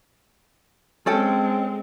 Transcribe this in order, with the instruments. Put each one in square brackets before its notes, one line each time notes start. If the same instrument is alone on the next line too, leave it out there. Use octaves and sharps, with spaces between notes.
[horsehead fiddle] G#3 C4 [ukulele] C#4 A4 G5